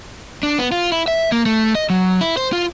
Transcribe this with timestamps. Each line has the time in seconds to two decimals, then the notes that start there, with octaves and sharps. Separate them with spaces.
0.43 D4
0.58 B3
0.72 F4
0.92 E4
1.08 E5
1.32 A#3
1.46 A3
1.75 D#5
1.90 F#3
2.21 E4
2.37 C5
2.53 F4